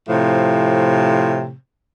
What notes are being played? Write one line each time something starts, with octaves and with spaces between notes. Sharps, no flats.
A2 C3 F3